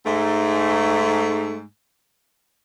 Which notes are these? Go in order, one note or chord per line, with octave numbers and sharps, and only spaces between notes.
G#2 A3